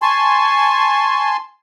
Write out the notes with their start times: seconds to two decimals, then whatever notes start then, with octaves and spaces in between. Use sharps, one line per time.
0.02 G#5 A5 C6 C#6